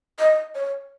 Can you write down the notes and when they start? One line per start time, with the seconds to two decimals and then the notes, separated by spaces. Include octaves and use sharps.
0.19 D#5
0.55 C#5